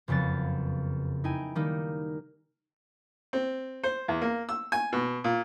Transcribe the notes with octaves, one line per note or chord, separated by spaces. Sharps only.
F#1 F2 C#3 B3 A6
D#4 E4 G5 G#5
D#3 G3 A#3 D#4
C4
C5
E2
A#3
E6
G#5
B2
A#2